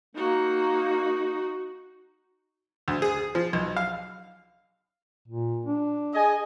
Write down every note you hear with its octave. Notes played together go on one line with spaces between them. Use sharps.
A#3 D#4 F#4
D2
G#4
F3
B1
F5
A#2
D4
G#4 D#5 G#5